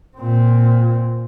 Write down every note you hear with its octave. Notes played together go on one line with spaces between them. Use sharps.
A#2 C4